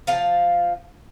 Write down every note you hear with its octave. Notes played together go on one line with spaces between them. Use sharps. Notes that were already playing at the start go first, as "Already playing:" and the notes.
F3 F5 A5